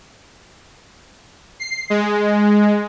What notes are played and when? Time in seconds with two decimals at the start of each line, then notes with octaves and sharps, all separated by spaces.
1.60 C7
1.90 G#3